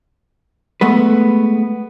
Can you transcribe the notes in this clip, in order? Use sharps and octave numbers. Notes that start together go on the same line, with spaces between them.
G#3 A3 B3 B4